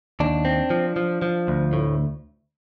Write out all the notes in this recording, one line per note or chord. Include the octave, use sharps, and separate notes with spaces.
D#2 D4
C4
F3
F3
F3
D2
A2